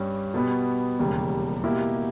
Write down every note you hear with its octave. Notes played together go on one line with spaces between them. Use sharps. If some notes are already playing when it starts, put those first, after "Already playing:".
Already playing: G2 G3 C#4
B2 G3 B3
E1 D#2 C#3 G3
B2 A#3 E4 G4